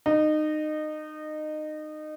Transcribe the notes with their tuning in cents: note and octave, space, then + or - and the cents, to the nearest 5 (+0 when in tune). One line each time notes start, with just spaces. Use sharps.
D#4 -25